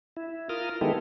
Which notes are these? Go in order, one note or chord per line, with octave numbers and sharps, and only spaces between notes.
E4
F4 A#4 D#6 F6
D#3 G#3 B3 E4 G4 A4